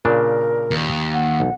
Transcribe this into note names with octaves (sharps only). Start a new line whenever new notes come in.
A#2 C#3 D4 A#4
D#2
F#5
B1